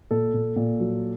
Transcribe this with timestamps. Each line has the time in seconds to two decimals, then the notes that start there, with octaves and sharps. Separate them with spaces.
0.11 A#2 A4
0.34 A#2
0.56 A#2
0.80 F#3